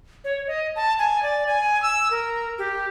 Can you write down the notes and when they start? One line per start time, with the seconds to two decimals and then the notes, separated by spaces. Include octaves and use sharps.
0.24 C#5
0.47 D#5
0.76 A5
0.99 G#5
1.23 D5
1.47 G#5
1.83 E6
2.11 A#4
2.58 G4